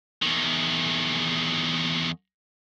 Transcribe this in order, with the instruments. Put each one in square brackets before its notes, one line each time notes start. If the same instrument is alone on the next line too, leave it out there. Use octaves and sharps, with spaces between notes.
[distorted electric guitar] E2 D#3